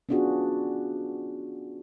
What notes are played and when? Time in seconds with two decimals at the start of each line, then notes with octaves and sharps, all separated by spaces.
0.09 B3 C#4 D4 F4 F#4 G#4